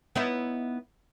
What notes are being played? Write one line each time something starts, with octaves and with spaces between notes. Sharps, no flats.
B3 D#4 E4